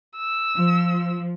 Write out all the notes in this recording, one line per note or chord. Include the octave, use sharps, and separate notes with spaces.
E6
F3